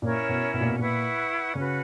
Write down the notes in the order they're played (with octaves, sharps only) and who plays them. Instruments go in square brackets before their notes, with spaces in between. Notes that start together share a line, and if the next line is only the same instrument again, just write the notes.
[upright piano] A#2 [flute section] C#4 E4 A#4 C#5
[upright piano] B2
B2
A#2
B2
[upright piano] A#2 [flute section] E4 B4 F#5 C#6
[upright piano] C#3 [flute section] C#4 F#4 B4